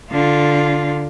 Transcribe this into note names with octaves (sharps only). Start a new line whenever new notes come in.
D3 F4